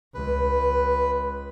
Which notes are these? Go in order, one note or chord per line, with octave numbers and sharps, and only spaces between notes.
C#2 B4